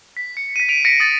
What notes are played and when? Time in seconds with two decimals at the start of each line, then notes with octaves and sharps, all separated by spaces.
0.17 B6
0.37 C#7
0.56 B6 D#7
0.68 B6 D7 F7
0.84 A#6 B6 C#7 D7
1.00 D#6 A6 A#6